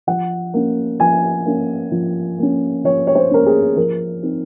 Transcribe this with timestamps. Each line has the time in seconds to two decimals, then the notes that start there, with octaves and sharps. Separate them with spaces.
0.07 F3 F#5
0.54 A#3 C#4
1.00 F3 G#5
1.46 A#3 C#4
1.92 F3
2.39 A#3 C#4
2.84 F3 C#5
3.07 C#5
3.15 C5
3.31 A#3 C#4 A#4
3.46 G#4
3.76 F3 A#4
4.23 C4 D#4